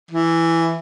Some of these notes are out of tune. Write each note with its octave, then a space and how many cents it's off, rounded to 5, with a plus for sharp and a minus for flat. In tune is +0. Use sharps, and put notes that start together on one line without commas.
E3 +5